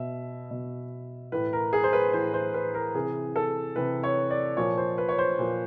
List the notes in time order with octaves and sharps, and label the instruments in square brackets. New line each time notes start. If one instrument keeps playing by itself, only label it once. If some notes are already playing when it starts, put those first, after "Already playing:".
Already playing: [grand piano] B2 E5
B2
A2 E3 B4
A#4
G#4
C5
B4
A2 E3 C5
C5
B4
A#4
C3 E3 G#4
A4
C3 E3 B4
C#5
D5
A#2 F3 C#5
C5
B4
C#5
C5
A#2 F3